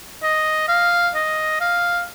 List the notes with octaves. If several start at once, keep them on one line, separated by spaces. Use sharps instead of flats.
D#5
F5
D#5
F5